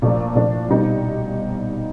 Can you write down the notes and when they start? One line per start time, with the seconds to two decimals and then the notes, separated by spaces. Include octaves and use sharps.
0.02 A#2 F3 A3 D4
0.35 A#2 F3 A3 D4
0.68 B2 G3 C4 D#4 G4